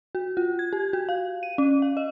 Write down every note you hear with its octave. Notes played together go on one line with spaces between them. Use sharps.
F#4
F4
G#6
G4
F#4
F5
D#7
C#4
F5
D#5